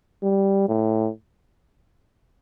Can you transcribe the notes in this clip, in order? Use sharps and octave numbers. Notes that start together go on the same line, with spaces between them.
G3
A2